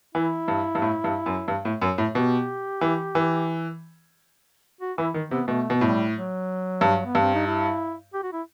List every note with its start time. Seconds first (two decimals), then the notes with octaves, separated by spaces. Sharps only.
0.15 E3 E4
0.48 G2
0.75 G2
0.82 A2
1.04 G2
1.26 F#2
1.48 G2
1.65 A2
1.82 F#2
1.98 A2
2.15 B2 G4
2.81 E3
3.15 E3
4.81 F#4
4.98 E3 E4
5.14 D#3
5.31 C3 B3
5.47 B2 A3
5.70 B2
5.81 A2 G3
6.14 F#3
6.81 G2
7.05 B3
7.15 G2
7.20 C4
7.34 D#4
7.48 E4
8.14 G4
8.23 F#4
8.33 E4